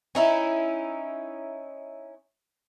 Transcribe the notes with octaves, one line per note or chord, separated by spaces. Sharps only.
C#4 D#4 E4